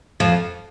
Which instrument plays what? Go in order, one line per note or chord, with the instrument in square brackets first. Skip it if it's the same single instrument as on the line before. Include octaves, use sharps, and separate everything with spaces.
[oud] F2 F3